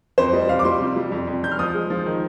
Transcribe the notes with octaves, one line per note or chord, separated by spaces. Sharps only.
F2 C5
G3 D#5
F2 F5
D6
G3 C6
C3
G3
F2
F2
F2 G6
F6
F3 D#6
G#3
F3
D#3